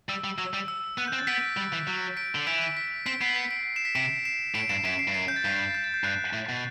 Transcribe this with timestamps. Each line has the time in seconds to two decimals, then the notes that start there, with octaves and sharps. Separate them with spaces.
0.09 G3 E6
0.24 G3
0.38 F#3 E6
0.54 G3
0.68 E6
0.98 B3 F#6
1.08 G6
1.13 C4
1.18 A6
1.27 B3 B6 D7
1.57 G3
1.73 E3
1.87 F#3
2.17 B6 D7
2.35 D3
2.47 E3 B6 D7
2.62 B6
2.77 B6
3.06 C4 B6 D7
3.21 B3 C7
3.36 B6
3.51 B6 D7
3.76 C7 E7
3.85 B6 D7
3.95 C3 B6 D7
4.25 C7 E7
4.55 A2 B6 D7
4.69 G2 C7 E7
4.84 F#2 B6 D7
4.99 C7
5.08 G2
5.14 F#2 C7
5.28 G6
5.36 A6
5.45 G2 B6
5.70 A6
5.74 G6
5.84 A6
5.94 G6
6.04 G2 F#6
6.33 A2
6.49 B2